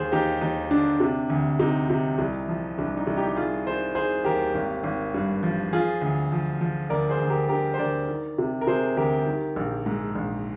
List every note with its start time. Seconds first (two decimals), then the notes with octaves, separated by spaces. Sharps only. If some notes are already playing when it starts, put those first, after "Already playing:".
Already playing: D#2 G#4 C5
0.12 D#2 D#4 G4
0.41 D#2 D#4
0.71 D3 D4
1.00 C3
1.30 D2
1.59 C3 D#4
1.90 C3
2.18 C2
2.48 F3
2.78 C2 D4
2.97 D#4
3.07 C2
3.17 D#4 G4
3.28 G4
3.36 D#3 F4 G#4
3.66 D#3 G#4 C5
3.95 D#3 G#4 C5
4.24 D#2 G4 A#4
4.54 G#1
4.83 G#1
5.14 G2
5.43 F3
5.72 F3 F4 G#4
6.02 D2
6.32 F3
6.61 F3
6.90 D2 A#4 D5
7.09 G#4 C5
7.20 D2
7.30 G4 A#4
7.49 D3 G4 A#4
7.74 C5
7.79 D2 A#4 D5
8.08 D#3
8.38 C3
8.61 A#4
8.67 C3 G#4 C5
8.97 D2 G4 A#4
9.26 D#3
9.56 A#1
9.86 G#2
10.15 A#1